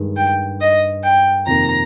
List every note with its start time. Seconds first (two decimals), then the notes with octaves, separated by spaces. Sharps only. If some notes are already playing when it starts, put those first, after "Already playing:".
Already playing: G2 D#3 G#3
0.17 G5
0.61 D#5
1.04 G5
1.46 F2 C3 D#3 A#3 A#5